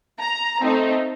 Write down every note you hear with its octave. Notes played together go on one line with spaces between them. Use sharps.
A#5
A3 C4 D#4